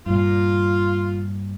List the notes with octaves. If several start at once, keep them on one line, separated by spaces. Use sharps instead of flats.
G2 A#2 F4